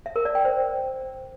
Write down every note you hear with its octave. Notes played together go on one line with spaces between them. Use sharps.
E5
A#4
D5
G5
C5